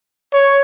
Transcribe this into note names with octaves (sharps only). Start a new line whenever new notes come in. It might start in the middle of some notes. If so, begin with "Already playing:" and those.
C#5